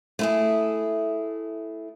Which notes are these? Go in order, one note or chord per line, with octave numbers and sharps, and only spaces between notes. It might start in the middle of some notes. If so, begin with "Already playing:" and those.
A3 E4 G#4